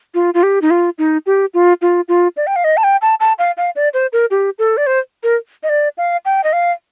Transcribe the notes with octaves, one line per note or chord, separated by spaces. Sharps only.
F4
F4
G4
D#4
F4
D#4
G4
F4
F4
F4
D5
G5
F5
D#5
A5
G5
A5
A5
F5
F5
D5
C5
A#4
G4
A4
D5
C5
A#4
D#5
D5
F5
G5
D#5
F5